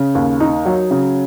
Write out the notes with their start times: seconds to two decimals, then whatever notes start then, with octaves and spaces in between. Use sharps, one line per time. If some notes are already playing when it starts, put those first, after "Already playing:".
Already playing: C#3
0.15 D#2
0.40 D#4
0.65 F#3
0.91 C#3